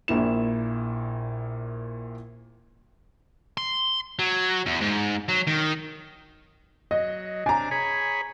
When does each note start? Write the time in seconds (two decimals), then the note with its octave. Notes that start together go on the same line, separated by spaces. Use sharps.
0.08 A#1 A#2 E4 E7
3.57 C6
4.19 F#3
4.66 E2
4.81 G#2
5.29 F#3
5.47 D#3
6.91 F#3 D#5
7.46 C3 D4 G#5 A#5
7.71 G#4 C#5 B5